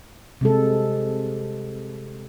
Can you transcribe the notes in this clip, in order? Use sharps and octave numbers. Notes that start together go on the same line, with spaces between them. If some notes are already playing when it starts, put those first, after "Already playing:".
C3 G#3 A4